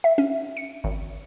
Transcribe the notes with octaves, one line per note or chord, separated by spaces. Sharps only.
E5
C#4
C#7
G#1